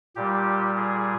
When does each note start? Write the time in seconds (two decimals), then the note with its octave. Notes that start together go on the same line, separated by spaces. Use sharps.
0.16 A#2 G3 G4
0.77 G#4